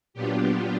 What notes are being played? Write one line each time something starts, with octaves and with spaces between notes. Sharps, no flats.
A#2 F#3 B3 D4 F4 G4